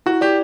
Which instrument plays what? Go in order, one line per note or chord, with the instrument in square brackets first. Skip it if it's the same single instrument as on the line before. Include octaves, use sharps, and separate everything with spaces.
[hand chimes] E4 [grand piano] F#4
[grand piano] G4 [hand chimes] D5